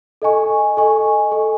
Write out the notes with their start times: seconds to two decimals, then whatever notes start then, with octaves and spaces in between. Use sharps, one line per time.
0.22 A4 D#5 G#5 C#6
0.77 A4 D#5 G#5 C#6
1.31 A4 D#5 G#5 C#6